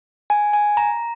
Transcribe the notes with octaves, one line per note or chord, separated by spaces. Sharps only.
G#5
G#5
A#5